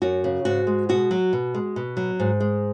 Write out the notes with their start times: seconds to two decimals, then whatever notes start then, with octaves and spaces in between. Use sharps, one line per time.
0.02 F#2 F#4
0.24 C#3
0.45 G#2 F#4
0.67 G#3
0.89 B2 F#4
1.11 F#3
1.33 B2
1.54 G#3
1.76 B2
1.97 F#3
2.20 G#2
2.40 G#3